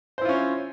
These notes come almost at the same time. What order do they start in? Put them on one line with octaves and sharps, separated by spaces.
C5 E4 F4 C#4